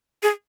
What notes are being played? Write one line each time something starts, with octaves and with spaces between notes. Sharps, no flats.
G#4